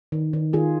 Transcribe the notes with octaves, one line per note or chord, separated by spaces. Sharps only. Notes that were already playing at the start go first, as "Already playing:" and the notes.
D#3
D#3
D#3 F4 G#4